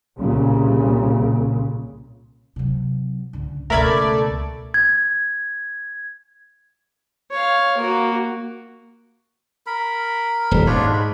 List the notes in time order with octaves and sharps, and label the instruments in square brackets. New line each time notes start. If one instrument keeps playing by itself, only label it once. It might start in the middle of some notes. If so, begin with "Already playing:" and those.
[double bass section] C2 A#2 C#3
[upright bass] C3 F#3
C#2 D3
[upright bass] C#2 B2 [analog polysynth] A3 D5 [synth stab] A#4 B5 G#6
[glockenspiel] G#6
[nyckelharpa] C#5 F5
A#3 F#4
[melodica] A#4 B5
[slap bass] D#1
[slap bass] G#2 [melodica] D4 F4 C#5
[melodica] B5